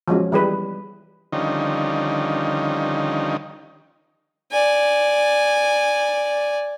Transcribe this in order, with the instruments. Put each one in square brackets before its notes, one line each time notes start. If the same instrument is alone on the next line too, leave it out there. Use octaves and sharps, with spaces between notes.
[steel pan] F3 F#3 G#3 C#4
E3 G3 G#4 B4
[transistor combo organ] D3 D#3 F3 G3 C#4 D#4
[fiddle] D5 G#5